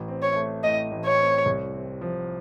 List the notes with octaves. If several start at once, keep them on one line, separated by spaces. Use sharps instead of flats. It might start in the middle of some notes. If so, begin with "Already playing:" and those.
Already playing: A1
C4
C#5
A3
A2 D#5
A1
C#5
C4
C2
C4
F3